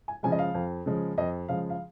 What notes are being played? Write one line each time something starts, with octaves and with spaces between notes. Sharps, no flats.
G#5
C#3 F3 G#3 G#5
D#5
F5
F2
C#3 F3 G#3
F2 D#5
C#3 F3 G#3 F5
F5